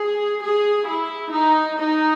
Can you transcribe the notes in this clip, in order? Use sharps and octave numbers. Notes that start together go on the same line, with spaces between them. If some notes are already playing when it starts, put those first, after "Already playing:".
Already playing: G#4
G#4
E4
D#4
D#4